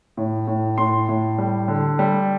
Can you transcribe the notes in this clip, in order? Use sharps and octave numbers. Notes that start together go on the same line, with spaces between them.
A2
A2
A2 C6
A2
G3
D3
G3